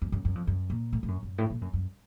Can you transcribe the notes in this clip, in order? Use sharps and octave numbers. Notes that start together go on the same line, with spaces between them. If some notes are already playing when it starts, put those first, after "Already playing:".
F#2
F#2
F#2
F2
F#2
A#2
A2
A2
F#2
F#2
A2
A#2
F#2
F#2